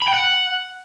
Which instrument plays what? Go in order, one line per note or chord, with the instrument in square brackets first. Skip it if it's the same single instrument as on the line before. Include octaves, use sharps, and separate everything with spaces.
[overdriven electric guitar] B5
G5
F#5